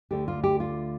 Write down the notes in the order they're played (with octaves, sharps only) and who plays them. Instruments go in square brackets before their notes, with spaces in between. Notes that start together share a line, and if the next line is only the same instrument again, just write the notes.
[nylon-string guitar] D2 D3 A3 G4
F4
G4
F4